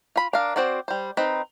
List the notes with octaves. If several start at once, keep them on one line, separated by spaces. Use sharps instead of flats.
F4 B5
D4 A#4 F5
C4 F#4 C5 D5
G3 C5
C4 D#4 B4